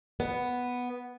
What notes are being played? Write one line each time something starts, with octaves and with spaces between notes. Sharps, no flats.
B3